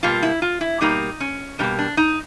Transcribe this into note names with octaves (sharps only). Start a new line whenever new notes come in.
B2 G3 A#3 F4
E4
F4
E4
B2 G3 A#3 D#4
C#4
B2 G3 A#3 C#4
D4
D#4